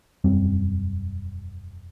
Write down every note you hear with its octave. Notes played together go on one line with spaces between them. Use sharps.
E1 F#2 G3 C4